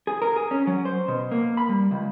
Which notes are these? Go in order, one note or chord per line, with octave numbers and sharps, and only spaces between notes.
G#4
A#4
G#4
C#4
F#3
C5
B2
A#3
B5
G3
C#2